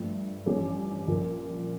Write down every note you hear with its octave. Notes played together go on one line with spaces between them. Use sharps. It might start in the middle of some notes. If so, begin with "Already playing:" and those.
Already playing: G2 F3 A3
A1 G2 F3 C#4 G4
A#1 A#2 F3